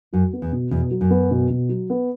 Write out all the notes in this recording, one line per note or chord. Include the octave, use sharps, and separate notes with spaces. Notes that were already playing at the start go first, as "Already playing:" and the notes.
F#2 F#3
B3
E2
B2
E2 B2
F#3
F#2
B3
B2
B2
F#3
B3